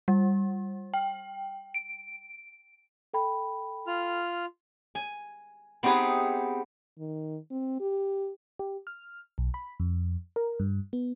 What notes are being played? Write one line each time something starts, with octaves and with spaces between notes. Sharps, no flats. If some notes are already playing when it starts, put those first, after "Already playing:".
G3
G5
D7
A4 G5 B5
F4 F6
G#5
B3 C4 D#4 G4 G#4 B4
D#3
C4
G4
G4
F6
B1
B5
F2
A#4
G2
B3